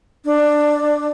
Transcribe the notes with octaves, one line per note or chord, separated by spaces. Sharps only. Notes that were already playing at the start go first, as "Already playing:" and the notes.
D4